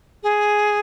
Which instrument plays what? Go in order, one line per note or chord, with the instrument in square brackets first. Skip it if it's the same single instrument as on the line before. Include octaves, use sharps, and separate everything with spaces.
[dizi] G#4